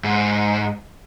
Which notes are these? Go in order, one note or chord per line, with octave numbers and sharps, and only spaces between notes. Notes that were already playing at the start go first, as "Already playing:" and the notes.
G#2